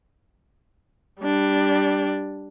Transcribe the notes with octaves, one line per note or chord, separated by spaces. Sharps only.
G3 D4